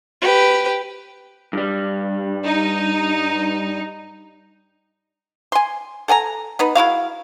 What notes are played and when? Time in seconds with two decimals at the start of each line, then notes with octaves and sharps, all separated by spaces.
0.22 G4 B4
1.53 G2 G3
2.43 D#4
5.52 G#5 C6
6.08 A4 F#5 G#5 A#5
6.59 B3 D#4 B4
6.75 G#3 E4 F#4 F5